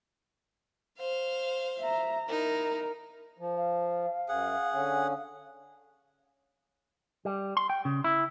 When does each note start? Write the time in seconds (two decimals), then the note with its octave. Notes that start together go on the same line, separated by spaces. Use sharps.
0.98 C5 F5
1.80 E5 A#5
2.29 D#4 E4 A#4
3.37 F3
3.56 F5
4.29 F#2 G#4 F#5
4.73 D3 C#4
7.25 G3
7.57 C6
7.70 G5
7.85 C#3
8.04 E4